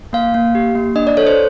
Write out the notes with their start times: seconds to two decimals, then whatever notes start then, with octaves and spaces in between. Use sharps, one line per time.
0.13 A#3 F5
0.34 A#3
0.55 G4
0.75 A#3
0.96 D4 D#5
1.07 D5
1.17 A4 C#5
1.27 C5